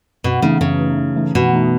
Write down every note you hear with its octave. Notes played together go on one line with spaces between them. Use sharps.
F#2 B2
C#3 E3 A3 D#4
F#2 C#3
E3 A3 D#4
F#2
E3 A3 D#4
F#2 B2
E3 A3 D#4